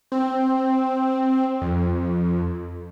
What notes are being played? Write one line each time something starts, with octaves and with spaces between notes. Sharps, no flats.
C4
F2